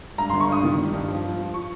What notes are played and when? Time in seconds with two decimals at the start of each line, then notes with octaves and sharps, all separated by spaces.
0.18 G2 A#5
0.30 C6
0.34 G1
0.40 C#6
0.49 G2 D#6
0.63 D#3
0.78 G3
0.94 G2
1.08 F3
1.24 F3
1.39 F3
1.54 C#6